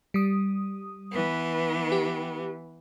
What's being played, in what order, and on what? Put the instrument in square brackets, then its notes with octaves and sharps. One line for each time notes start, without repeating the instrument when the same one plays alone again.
[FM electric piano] G3 D#6
[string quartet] E3 B3
[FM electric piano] G4